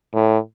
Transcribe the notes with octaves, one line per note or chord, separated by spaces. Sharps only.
A2